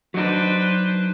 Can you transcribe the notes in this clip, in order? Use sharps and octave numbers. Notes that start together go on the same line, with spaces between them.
F#3 D4 D#4 B4 C5